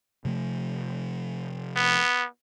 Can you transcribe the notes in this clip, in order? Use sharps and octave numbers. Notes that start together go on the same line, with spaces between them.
C3 F3 A3
B3